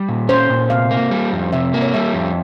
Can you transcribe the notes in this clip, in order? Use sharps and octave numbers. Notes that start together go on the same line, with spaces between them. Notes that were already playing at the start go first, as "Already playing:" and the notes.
Already playing: G3
A#2
C#4 C5
A#2
C3 F5
A#3
G3
F2
C3 E5
A#3
C#5
G3 E5
F2